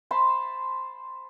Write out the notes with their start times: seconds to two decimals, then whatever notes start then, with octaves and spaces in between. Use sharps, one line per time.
0.11 C5 A5 B5 C6